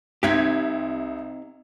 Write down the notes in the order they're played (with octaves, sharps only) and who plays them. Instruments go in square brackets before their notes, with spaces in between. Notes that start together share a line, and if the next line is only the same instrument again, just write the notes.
[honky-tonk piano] C2 G#6 B6 [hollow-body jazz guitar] C4 D#4 G4